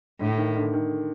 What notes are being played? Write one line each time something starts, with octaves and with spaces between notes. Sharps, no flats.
A2 D3
D#3
D3
D#3